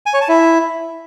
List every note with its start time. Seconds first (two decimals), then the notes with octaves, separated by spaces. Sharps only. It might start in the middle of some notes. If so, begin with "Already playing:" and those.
0.06 G#5
0.14 C#5
0.21 A5
0.29 E4